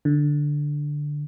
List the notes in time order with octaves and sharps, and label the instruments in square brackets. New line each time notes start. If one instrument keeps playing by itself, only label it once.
[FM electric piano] D3